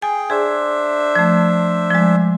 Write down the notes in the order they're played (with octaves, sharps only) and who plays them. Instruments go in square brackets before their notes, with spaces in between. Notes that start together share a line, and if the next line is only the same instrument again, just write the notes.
[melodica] G#4 G5 [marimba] G#5
[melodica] D4 C5 E5 [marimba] G#4
[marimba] F3 A3
F3 G#3